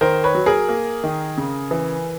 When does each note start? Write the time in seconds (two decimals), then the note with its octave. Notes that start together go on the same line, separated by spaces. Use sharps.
0.01 D#3 A#4 C5
0.24 B4 C#5
0.35 F#3
0.46 G#4 A#4
0.69 A#3
1.04 D#3
1.38 C#3
1.71 E3